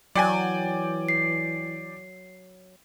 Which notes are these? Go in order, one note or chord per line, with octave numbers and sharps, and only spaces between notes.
E3 F#3 D5 G5 G#5
C7